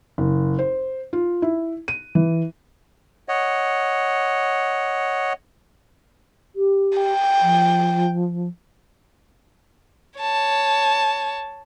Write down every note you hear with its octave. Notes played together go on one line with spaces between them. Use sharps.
F#1
C5
F4
E4
D#7
E3
C#5 D#5 F#5
G4
G5
F3
C#5 A5